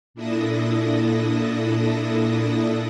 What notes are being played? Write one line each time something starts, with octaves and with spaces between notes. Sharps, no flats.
A#2 D4 E4 A4 D#6 A#6